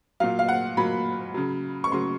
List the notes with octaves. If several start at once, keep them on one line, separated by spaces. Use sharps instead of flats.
A#2 F#3 F5
F5
F#5
A#2 F#3 B5
C#3 F#3
C#6
C#3 F#3 C6